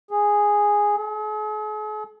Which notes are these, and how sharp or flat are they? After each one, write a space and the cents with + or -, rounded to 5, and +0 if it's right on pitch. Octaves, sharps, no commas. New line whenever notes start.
G#4 -5
G#4 +45